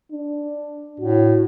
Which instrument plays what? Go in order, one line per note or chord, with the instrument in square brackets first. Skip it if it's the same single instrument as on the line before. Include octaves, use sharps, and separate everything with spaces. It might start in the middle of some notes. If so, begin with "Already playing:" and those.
[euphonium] D4
[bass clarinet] A2 [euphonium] F#4